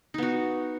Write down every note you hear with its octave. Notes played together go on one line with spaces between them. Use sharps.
B3 D#4 F#4